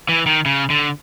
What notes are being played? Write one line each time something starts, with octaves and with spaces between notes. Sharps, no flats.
E3
D#3
C#3
D3